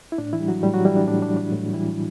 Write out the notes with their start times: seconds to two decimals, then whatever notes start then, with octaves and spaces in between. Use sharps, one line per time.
0.12 E4
0.18 A2 D4
0.33 E3 E4
0.40 G3
0.48 F#3 F#4
0.63 A2 G3 G4
0.74 F#3 F#4
0.85 E3 G3 E4
0.96 D4
1.07 A2 D4
1.22 D4
1.30 G3
1.37 D4
1.52 A2
1.74 E3 G3 E4